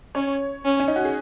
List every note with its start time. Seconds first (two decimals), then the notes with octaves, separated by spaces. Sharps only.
0.15 C#4 C#5
0.65 C#4
0.80 C#4
0.88 D#4
0.96 F#4
1.05 G#4